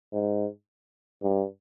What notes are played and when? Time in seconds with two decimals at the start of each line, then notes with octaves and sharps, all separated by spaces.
0.13 G#2
1.23 G2